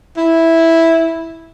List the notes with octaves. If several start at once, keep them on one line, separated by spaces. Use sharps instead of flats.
E4